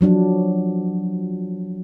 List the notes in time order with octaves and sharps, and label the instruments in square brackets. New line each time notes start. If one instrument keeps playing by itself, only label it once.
[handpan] F3 F#3 D4